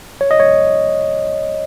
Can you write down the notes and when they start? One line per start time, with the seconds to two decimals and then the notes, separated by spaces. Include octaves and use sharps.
0.21 C#5
0.31 D#5
0.40 C#5